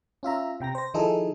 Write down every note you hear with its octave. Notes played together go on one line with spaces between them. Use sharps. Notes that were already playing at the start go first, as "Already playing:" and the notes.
C#4 F4 E5 A#5
C3 G5 A#5 A#6
C5 A#6
D#3 F3 D#4 E4 G#4 A4